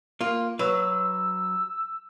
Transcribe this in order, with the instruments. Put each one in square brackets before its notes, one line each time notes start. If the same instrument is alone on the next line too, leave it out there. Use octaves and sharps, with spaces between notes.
[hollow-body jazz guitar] A#3 F4
[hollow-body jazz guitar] F#3 B4 [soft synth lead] E6